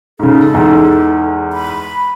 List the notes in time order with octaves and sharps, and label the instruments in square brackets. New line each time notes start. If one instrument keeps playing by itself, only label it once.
[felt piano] G#2 C#3 [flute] A4
[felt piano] E2 G#2
[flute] B5